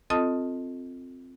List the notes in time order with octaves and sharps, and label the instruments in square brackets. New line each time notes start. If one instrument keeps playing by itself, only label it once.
[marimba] C4 F4 A4 D#5 A5 D#6